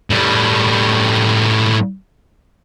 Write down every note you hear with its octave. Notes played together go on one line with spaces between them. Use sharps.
A2 G3